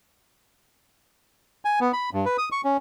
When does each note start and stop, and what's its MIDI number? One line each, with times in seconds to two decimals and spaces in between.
1.65 1.79 80
1.80 1.92 59
1.93 2.10 83
2.13 2.25 43
2.26 2.37 71
2.38 2.49 87
2.52 2.61 85
2.64 2.77 61